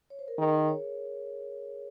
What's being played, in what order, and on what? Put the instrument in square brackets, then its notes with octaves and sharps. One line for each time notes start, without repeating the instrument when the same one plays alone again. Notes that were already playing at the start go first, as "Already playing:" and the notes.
[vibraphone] C#5
C5
A#4
[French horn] D#3 [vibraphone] G#4
[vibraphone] C#5